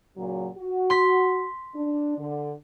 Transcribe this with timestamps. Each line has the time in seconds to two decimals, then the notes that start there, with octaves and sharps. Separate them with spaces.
0.17 A#2 C#3 F#3
0.57 F#4
0.90 C6 B6
1.75 D4
2.18 D3